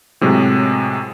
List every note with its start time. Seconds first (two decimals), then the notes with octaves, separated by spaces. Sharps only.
0.21 A2 C3 F#3 G#3